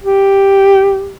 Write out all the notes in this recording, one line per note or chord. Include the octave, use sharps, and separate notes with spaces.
G4